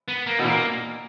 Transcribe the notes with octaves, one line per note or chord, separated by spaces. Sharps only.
B3
A#3
B2 A3
A#2 A#3